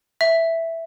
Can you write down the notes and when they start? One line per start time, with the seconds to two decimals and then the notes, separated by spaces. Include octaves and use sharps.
0.21 E5